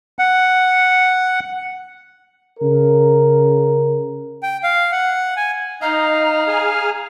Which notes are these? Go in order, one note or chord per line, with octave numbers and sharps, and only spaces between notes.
F#5
C#3 A#4
G5
F5
F#5
G#5
D#4 D#5 F5 A#5
G#4 G#5 F6